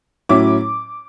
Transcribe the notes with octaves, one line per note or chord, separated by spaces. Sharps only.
A2 F#3 C#4 E4 D6